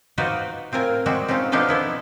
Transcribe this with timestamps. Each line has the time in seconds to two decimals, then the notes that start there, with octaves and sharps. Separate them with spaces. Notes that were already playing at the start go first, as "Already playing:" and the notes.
0.18 D#4 F4 F#4 B4 C5 D5
0.72 A2 C4 F4 A#4 G#5
1.06 G3 G#3 C4 F#4
1.28 C4 C#4 D#4 F4
1.52 B2 F3 D4 D#4 F4 A4
1.68 B3 E4 A4